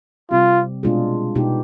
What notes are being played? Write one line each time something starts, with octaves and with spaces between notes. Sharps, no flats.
C3 G3 C4 F4 G4
B2 G#3 D4 F4 G#4
B2 B3 D#4 G4